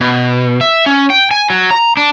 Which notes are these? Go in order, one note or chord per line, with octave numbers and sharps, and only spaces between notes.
B2
E5
C#4
G5
G#5
F#3
A#5
D4